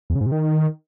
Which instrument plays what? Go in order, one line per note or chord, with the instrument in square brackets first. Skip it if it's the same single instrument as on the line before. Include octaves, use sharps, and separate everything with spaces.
[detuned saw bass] E2
C#3
G#2
C3
D#3